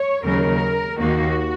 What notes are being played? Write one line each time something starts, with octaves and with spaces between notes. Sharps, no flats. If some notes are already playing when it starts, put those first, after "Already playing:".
Already playing: C#5
D#2 C#3 F#3 A#4
D#2 D#3 A#3 D#4 F#4